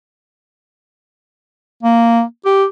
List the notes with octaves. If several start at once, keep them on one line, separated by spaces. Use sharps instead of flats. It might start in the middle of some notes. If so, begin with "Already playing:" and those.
A#3
G4